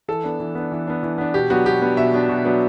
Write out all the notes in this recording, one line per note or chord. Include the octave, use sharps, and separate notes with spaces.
E3 A4
B3 D4
E3
B3 D4
E3
B3 D4
E3
B3 D4
B2 G4
F#3 B3 D4 F#4
B2 G4
F#3 B3 D4
B2 E5
F#3 B3 D4
B2
F#3 B3 D4